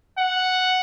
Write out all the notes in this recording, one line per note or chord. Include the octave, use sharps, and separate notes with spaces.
F#5